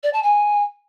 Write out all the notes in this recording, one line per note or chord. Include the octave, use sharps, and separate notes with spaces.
D5
A5
G#5